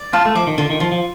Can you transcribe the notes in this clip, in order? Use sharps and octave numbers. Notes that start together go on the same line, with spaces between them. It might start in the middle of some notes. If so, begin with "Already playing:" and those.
Already playing: D5
F4 A5
A3
F3 D6
D#3
D3 F4
D#3
F3 F4
F3